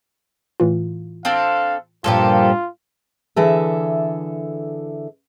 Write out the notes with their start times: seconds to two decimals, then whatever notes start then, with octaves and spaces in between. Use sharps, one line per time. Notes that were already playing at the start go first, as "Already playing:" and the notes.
0.60 A2 E3 F4
1.25 C4 D4 A4 F5
2.04 G2 A#2 F3 F4 G4 A4
3.36 D3 E3 G#4 A4 E5